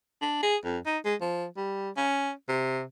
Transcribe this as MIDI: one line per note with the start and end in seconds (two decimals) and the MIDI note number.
0.21 0.41 62
0.43 0.57 68
0.64 0.78 41
0.86 0.98 63
1.05 1.15 56
1.21 1.45 53
1.56 1.90 55
1.97 2.32 61
2.48 2.83 48